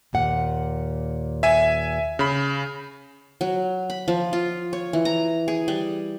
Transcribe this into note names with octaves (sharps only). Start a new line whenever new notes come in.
D#2 A#2 F#5
E5 G#5
C#3 B5
F#3
B5
F3
F4
C#5
E3
A#5
G#4
G3